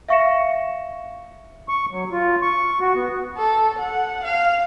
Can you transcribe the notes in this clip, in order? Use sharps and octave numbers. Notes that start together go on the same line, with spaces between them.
E5 F5 C#6 A#6 C#7 E7
C#6
F#3
F4
C#6
F#4
B3
A4
F#5
F5